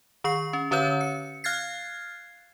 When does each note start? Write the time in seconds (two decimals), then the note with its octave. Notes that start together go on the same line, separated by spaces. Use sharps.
0.24 D#3 C#6 C7
0.53 C#4
0.71 D3 C#4 B4 C#5 G6
1.01 C#7
1.44 F5 F6 F#6 G#6 A6 C7